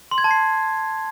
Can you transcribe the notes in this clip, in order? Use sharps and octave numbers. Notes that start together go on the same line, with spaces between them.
C6
G#6
A5
C7